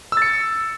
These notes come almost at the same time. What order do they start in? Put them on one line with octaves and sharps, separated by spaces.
E6 A6 C#7